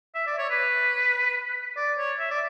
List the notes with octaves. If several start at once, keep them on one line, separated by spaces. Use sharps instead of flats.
E5
D5
C#5
B4
D5
C#5
E5
D5